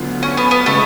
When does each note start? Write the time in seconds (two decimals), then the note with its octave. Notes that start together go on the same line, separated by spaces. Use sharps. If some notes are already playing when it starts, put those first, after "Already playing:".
Already playing: D2 D3 F#3 B3 F4
0.23 C#4
0.37 B3
0.51 B3
0.66 C#3 G#3 A3